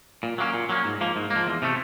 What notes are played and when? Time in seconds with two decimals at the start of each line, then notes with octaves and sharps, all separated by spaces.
0.23 A#2
0.38 F#3 A#3 C#4
0.54 A#2
0.69 F#3 A#3 C#4
0.85 G#2
1.01 F3 A#3
1.16 G#2
1.30 A#3
1.36 F3
1.47 E2
1.62 C3 F3 A3